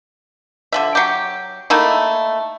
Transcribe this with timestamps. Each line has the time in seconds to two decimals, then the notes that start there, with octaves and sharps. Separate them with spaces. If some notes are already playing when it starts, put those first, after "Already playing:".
0.72 D3 F3 E5
0.95 F#3 G4
1.70 A3 A#3 D#4 E4